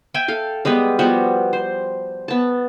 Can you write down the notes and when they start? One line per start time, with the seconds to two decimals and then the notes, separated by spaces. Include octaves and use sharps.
0.14 E5 G5 G#5
0.28 A4 F5
0.65 G3 G#3 B3 B4
0.99 F3 G3 B3 F#4
1.53 C5
2.28 B3 A5